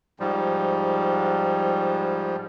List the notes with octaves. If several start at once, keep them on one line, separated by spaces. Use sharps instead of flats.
G#2 F3 G3